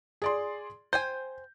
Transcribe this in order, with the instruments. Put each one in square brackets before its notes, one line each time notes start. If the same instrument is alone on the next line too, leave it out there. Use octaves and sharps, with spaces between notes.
[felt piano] G#4 D5 C6
[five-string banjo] C5 G5 G#5 [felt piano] G6